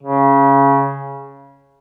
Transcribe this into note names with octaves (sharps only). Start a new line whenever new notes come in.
C#3